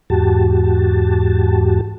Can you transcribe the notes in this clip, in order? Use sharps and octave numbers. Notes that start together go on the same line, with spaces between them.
E2 G#2 F#4 G4 A5